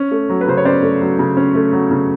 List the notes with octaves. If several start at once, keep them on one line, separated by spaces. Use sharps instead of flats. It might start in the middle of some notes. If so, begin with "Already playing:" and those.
Already playing: C#4
A3
F#3
B4
C#3 C5
C#5
C#4 C5 D5
A3
F#3
C#3
C#4
A3
F#3
C#3